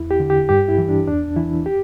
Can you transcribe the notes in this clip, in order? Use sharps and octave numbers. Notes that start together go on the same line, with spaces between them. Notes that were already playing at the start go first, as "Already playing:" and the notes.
Already playing: E2 E4
G4
D3
G4
G2 G4
E4
E3
D4
E2 D4
E3 E4
G4